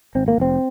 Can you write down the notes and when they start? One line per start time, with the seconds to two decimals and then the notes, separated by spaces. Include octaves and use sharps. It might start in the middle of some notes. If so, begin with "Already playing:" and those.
0.15 G#1 C4
0.28 A#3
0.38 F1 C4